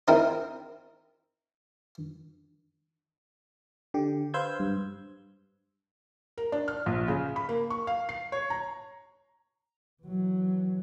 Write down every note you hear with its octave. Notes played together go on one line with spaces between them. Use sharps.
C4 D#4 E4 A#4 C5
D3 G4
B4 C5 F5 E6 G6 G#6
G2
A#4
D4
F6
A#1
C#3
B5
A#3
C#6
F5
C7
C#5
A#5
E3 F#3